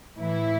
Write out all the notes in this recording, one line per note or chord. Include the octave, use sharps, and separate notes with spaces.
A2 E3 E4